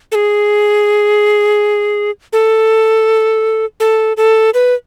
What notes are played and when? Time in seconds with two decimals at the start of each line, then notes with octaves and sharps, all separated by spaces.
0.12 A4
0.15 G#4
2.33 A4
3.80 A4
4.17 A4
4.54 B4